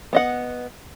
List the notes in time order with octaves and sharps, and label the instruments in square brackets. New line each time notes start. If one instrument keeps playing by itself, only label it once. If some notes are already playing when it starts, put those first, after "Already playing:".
[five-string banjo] B3 D#5 F#5